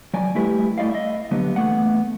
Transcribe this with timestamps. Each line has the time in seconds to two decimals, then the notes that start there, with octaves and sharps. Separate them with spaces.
0.14 F#3 D5 G#5
0.35 G3 A3 E4 G4 B4 E5
0.78 A3 E4 D5 D#5 F5
0.91 D#5 E5
1.31 D3 F#3 G3 A#3 B3
1.56 E2 E3 A3 B3 F#5